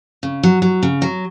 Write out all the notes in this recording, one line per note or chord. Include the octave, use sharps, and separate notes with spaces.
C#3
F#3
F#3
C#3
F#3